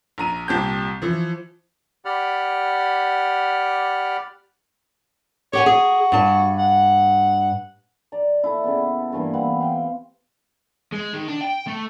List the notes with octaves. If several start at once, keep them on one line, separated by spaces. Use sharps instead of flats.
A#1 A#5 D#7
C2 A#2 G4 A5 G6
E3 F3
G4 D5 F#5 B5 F6
G4 C#5 F#5 G#5
F#4 G#4
G2 A5
F#5
D5 A#5
E4 A4
C#3 B3
G2 E3 A#3
B3 C4 B4 F#5
F5 G5 C6
G#3
D#3
D4
G5
A3